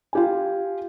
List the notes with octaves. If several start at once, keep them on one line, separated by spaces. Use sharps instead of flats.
F4 G4 G#5